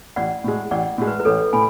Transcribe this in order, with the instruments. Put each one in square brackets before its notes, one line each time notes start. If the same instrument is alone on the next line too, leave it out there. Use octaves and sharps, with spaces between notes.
[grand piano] A1 [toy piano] D5 F#5
[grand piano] A2 G#3
[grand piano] A1 [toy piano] D5 F#5
[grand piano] A2 G#3
[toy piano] B4
B4
[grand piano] A1 [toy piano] A4 C#5
[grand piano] A2 [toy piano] G#5 B5